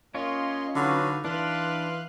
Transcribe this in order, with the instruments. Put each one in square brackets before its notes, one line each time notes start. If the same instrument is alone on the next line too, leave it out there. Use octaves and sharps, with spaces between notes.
[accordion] A#3 D#5 C6 [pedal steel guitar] C#4 F4 C#5
[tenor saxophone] D3 [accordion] F#3 F#4 B4 [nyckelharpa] D#4 F5
[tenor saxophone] E3 [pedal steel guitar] D4 [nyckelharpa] B4 F5 [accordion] C6 F#6